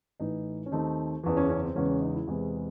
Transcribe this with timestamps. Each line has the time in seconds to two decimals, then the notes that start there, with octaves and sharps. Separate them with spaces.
0.20 A1 A2 E3 D#4
0.66 C#4
0.71 D#2 D#3 A3 C4 D#4
1.23 F#1 E2 C#3 E3
1.37 C#4
1.49 C#4
1.63 C4
1.75 E2 C#3 E3 G#3 C#4
1.89 C#4
2.01 D#4
2.14 E4
2.27 E2 C3 E3 G#3 C4